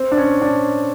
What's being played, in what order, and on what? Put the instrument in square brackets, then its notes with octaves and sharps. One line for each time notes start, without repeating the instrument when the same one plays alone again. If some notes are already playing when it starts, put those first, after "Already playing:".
Already playing: [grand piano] C4
D4
C#4
D4